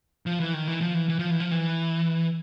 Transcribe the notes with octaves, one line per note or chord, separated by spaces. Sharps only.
F3
E3
D#3
E3
F3
E3
E3
F3
E3
F3
E3